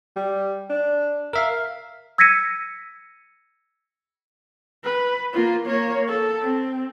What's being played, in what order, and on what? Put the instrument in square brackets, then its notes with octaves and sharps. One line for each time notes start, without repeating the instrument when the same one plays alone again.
[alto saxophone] G3
D4
[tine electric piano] A#4 E5 F5
[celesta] E6 G#6 A#6 B6 C#7 D#7
[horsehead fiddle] B4
A#3 F4
A#3 C#5
A4
C4